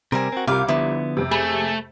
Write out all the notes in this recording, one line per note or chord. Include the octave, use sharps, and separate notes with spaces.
C3 G3 C4 A#4 G#5
C4 F#4
C2 C3 G3 F4 A#4 F5 D6
D3 F3 B3 E4
F2 C3
A3 G#4 B5